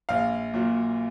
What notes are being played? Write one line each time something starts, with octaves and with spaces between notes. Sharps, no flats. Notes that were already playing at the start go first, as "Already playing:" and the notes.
A#1 F5
A#2 F#3